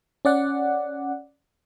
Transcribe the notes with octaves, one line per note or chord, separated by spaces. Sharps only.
C#4 D5 F#5